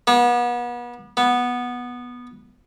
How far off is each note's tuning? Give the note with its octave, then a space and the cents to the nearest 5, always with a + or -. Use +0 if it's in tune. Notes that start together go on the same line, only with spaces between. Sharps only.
B3 -35
B3 -10